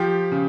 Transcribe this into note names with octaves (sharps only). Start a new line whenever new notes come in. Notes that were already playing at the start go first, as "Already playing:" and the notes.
Already playing: F3 G4
C#3